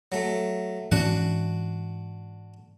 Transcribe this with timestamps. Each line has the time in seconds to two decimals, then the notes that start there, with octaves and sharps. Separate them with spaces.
0.12 F#3 A3
0.92 G#2 E3 C#4 D4 F#4 F#5